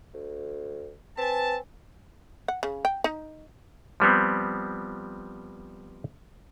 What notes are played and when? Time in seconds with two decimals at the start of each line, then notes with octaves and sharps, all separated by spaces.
0.14 D2
1.17 C4 B4 G#5 A5
2.48 F#5
2.63 C#3
2.85 G5
3.04 D#4
4.00 F3 G3 B3 C4